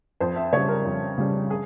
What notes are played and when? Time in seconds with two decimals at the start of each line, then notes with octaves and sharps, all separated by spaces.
0.20 F2 C5
0.36 E5
0.53 C#3 G3 C#5
0.68 A#4
0.85 F2
1.18 C#3 G3
1.50 G#4